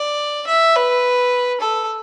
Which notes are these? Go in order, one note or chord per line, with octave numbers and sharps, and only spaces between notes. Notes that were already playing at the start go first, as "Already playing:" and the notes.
Already playing: D5
E5
B4
A4